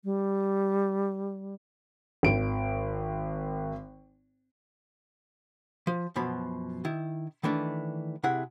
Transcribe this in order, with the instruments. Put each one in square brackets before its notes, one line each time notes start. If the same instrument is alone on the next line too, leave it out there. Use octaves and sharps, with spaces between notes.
[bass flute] G3
[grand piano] G#1 D7
[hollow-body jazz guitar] F3
F#2 B2 F3 B5
D#3 E4
D#3 E3 A3 D4
C3 E4 G#4 F#5